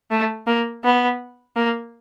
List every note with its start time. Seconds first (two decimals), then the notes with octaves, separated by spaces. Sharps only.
0.11 A3
0.47 A#3
0.84 B3
1.56 A#3